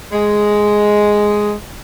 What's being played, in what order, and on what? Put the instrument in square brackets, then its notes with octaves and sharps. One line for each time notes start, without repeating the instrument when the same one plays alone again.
[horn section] G#3